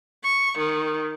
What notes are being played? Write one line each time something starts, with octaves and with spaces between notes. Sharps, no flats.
C#6
D#3